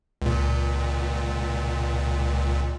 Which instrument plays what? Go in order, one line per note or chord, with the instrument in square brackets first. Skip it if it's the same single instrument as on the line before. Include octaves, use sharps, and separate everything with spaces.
[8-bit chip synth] C#2 A#2